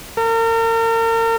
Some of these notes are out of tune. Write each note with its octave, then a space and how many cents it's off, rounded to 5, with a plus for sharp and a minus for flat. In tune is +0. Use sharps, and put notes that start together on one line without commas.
A#4 -40